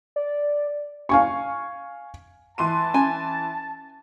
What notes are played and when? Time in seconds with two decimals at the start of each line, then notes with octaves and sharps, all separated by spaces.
0.16 D5
1.09 F5 G#5 C#6
2.58 E3 A5 C6 D#7
2.94 C#4 G#5